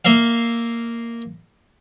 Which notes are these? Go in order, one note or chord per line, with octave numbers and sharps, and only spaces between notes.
A#3 E5 F5